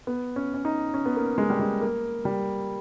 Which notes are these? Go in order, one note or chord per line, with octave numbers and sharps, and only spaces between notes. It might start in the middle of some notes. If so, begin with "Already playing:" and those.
B3
C#4
C#4
D#4
C#4
B3
A#3
G#3
G3
G#3
A#3
G3